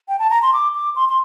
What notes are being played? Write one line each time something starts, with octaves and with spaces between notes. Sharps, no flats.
G5
A5
A#5
C6
D6
D6
C6
C6